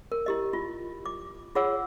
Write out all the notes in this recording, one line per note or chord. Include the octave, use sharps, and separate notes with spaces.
A#4
E4 G4 D#5
F4
D6
F4 G#4 C#5 F#5 E6